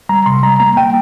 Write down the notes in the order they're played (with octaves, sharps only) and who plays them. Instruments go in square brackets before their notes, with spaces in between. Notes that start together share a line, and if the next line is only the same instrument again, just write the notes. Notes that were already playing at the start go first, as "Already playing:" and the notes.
[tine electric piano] G3 A#5
C3 C6
G3 A#5
A#3 A#5
A#3 G5